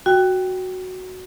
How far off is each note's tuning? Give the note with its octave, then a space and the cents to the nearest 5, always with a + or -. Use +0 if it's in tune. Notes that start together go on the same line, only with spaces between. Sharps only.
F#4 +0 G5 +0